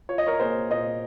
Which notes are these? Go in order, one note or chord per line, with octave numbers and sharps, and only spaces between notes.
F4 C#5
D#5
A#4 C#5
A#3 G#4 C5
A#2 C5 D#5